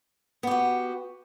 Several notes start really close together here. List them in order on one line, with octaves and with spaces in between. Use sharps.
B3 G4 F#4